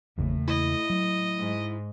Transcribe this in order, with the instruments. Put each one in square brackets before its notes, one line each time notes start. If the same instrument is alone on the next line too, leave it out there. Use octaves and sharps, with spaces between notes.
[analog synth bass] G#1 [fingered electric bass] E2 C#3 A#3 [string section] A2
[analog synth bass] E4 [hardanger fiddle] D#5
[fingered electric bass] F#3
[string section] G#2